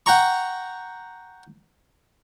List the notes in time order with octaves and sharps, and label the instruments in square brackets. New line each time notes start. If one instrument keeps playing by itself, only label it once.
[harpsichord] F#5 G5 A#5 C#6